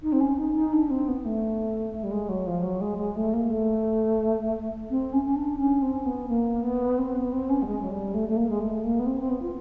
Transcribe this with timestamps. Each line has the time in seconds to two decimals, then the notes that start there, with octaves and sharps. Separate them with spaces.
0.03 D#4
0.13 C4
0.21 C#4
0.38 D#4
0.55 D#4
0.73 D4
0.90 C4
1.08 B3
1.25 A3
2.03 G3
2.11 G#3
2.29 F#3
2.47 F3
2.63 F#3
2.81 G#3
2.98 G#3
3.16 A3
3.33 A#3
3.50 A3
4.90 C4
5.13 C#4
5.25 C#4
5.36 D4
5.59 C#4
5.82 C4
6.06 B3
6.29 A#3
6.63 B3
6.98 C4
7.15 B3
7.33 C4
7.50 C#4
7.62 G3
7.67 G#3
7.82 F#3
7.91 G3
8.14 A3
8.28 A3
8.36 A#3
8.50 G#3
8.60 A3
8.84 A#3
9.00 B3
9.06 C4
9.19 C4
9.30 B3
9.42 F4